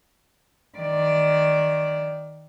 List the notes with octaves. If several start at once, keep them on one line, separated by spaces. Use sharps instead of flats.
D#3 D5